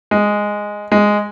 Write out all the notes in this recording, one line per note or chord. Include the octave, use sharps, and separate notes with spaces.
G#3
G#3